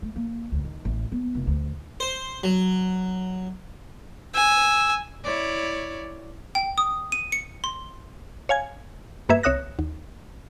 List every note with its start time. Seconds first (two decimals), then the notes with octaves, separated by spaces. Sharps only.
0.02 A3
0.16 A#3
0.52 D2
0.65 D#3
0.85 A1
1.12 B3
1.35 F1
1.47 D2
2.00 C5
2.43 F#3
4.34 G#5 E6
5.24 E4 C#5 D5
6.55 G5
6.78 D#6
7.12 D#7
7.32 C#7
7.64 C6
8.49 C#5 F5 G#5 G#6
9.29 G2 A#3 B4 E5 G#6
9.43 C2 C#5 E5 D#6 F#6 A#6
9.79 D#2